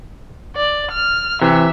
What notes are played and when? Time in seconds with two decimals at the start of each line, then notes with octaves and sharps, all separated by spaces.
0.56 D5
0.91 F6
1.41 C3 E3 E5